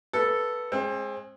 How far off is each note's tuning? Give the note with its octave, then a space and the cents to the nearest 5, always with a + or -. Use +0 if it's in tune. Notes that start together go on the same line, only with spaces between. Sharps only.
B3 -15 A4 +0
G#3 +0 C4 +30